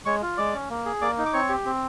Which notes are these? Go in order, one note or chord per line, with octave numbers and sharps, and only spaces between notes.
G#3 C#5 C#6
F4
G#3 D5 D6
C#4
A#3
G#4
A#3 D5 D6
D#4
D6
C4 C#5 C#6
G4
C4